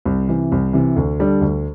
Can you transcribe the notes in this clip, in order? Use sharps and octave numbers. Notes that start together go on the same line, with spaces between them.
C2
C3 E3
C2
C3 E3
D2
D3 G3 D4 A4
D2